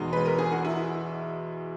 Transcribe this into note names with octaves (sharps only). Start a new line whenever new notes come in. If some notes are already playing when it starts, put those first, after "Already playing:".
Already playing: E2 B2 G#3 D#4
B4
A#4
G#4
F#4
E4